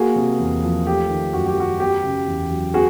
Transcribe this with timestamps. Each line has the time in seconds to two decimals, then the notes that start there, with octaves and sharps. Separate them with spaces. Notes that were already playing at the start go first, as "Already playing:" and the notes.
Already playing: A#3 F#4 G#4
0.16 C3
0.39 E2
0.63 F3
0.86 A3 G4
1.10 D#3
1.33 F#2 F#4
1.46 G4
1.57 F#3 F#4
1.80 B3 G4
2.03 C#3
2.27 E2
2.51 F#3
2.74 B3 F#4 G#4